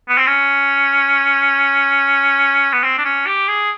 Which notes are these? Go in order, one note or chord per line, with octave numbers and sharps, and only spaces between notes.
B3
C4
C#4
B3
C4
D4
C#4
G4
G#4